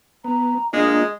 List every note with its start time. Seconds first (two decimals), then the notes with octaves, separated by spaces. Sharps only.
0.24 B3 A#5
0.73 G#3 A#3 D4 F4 D#5